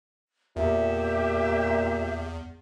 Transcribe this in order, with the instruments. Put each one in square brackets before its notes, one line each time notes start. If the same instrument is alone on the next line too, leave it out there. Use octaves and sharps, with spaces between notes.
[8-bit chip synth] E2 [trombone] A#2 [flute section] G4 E5